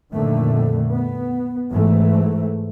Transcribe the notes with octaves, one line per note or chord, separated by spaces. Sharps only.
F2 A#2 D3 D#3 A3
B3
G#2 E3 A3